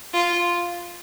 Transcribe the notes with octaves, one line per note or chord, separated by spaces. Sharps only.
F4